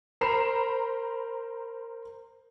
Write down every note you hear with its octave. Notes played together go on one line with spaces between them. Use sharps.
A#4 C5 A#5 B5 C7 E7